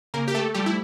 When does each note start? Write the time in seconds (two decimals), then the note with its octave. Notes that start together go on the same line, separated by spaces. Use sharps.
0.14 C#3 A#3 A#4
0.28 G4
0.35 A3 A4
0.54 F3 G3 A3 G4
0.66 E4